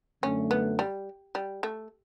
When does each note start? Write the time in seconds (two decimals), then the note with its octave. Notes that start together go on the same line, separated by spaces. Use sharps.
0.23 F#2 D3 A3 C#4
0.51 B3
0.79 G3
1.35 G3
1.63 A3